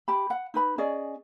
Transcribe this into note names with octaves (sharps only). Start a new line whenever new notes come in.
G4 B5
F#5
D#4 B4 B5
C#4 G#4 D5 D#5